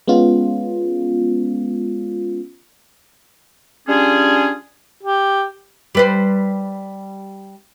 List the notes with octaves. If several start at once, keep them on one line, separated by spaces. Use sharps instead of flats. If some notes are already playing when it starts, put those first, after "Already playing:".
G#3 B3 C#4 F4
G3 C#4 D4 F4 G#4
G4
G3 B4 C5